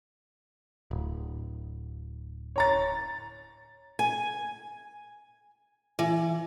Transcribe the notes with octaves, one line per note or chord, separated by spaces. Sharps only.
D1
C#5 A#5 A6
G#5
E3